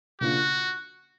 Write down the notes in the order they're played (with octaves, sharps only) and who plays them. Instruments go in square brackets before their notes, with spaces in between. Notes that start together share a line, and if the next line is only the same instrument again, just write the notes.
[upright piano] C#3 F3 A#3 D4 F4 [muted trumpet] F#4